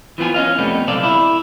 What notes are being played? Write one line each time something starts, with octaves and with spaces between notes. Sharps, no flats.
E3 F3 B3 F4 G#5
C#4 D#5 F5
F2 C3 G3 A3 B3
B1 C3 F3 A4 D5 F5
E4